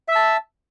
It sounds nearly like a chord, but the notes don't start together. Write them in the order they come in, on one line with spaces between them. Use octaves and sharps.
E5 E6 A5